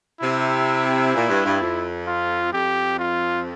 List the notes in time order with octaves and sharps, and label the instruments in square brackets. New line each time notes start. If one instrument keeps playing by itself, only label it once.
[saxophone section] C3 [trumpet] E4
[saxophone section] A#2
G2
G2
F2
[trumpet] F4
[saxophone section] F2 [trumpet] G4
[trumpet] F4